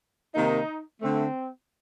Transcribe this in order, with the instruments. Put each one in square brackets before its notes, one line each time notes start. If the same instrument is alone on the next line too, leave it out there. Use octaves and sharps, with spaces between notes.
[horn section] C3 D#3 A#3 D#4
D3 A3 C4